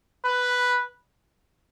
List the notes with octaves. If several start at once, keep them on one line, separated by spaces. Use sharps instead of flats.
B4